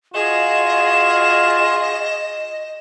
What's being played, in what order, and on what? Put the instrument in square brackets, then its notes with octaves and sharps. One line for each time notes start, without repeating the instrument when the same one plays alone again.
[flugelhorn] F4 [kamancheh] F#4 G#4 [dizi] D#5 [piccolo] E7